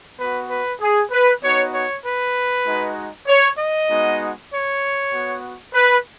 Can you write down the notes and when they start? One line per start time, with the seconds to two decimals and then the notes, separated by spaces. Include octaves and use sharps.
0.18 B3 F#4 B4
0.49 B4
0.80 G#4
1.11 B4
1.41 B3 D#4 F#4 C#5
1.73 C#5
2.03 B4
2.65 G#3 D#4 F#4
3.27 C#5
3.57 D#5
3.88 G#3 B3 D#4 F#4
4.51 C#5
5.12 B3 F#4
5.74 B4